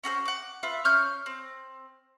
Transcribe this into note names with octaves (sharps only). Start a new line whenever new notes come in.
C#4 F#4 A4 C5
F#5 D6
F4 B4 E5
C#4 C#6 F6 G6
C4